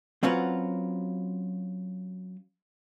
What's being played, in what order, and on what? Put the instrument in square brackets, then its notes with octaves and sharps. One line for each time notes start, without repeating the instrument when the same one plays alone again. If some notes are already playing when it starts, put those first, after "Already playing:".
[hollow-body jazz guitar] F#3 C4 C#4 F4 F#4 B4